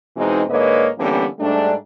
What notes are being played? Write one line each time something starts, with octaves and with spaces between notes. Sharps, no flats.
B2 E3 G#3 C4 D#4
G#2 D3 A#3 B4 C#5 D#5
D3 E3 G3 A#3 B3 C#4
G#2 G3 A3 D4